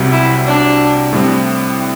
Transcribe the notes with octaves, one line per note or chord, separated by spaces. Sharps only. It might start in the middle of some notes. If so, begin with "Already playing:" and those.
Already playing: C2 C3 F#3
E4
D4
A2 G3 C4